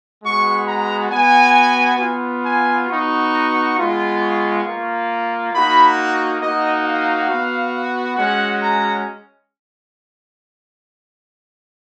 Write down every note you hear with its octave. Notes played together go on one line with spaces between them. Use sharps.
G#3 B3 F#4 C#6
A#5
B3 F#4 G#5
B3 F4
G#5
B3 D#4 F#4 C#6
G#3 B3 F4
C#6
F4
A#3
A#3 D#4 F#4 B5
A#3 D#4 F#4 D#5
F5
B3 F#4
G#3 C#4 F#4 F#5
A#5